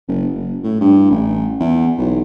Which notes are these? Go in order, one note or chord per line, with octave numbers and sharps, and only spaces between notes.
F#1
F#1
A2
G2
A1
E2
B1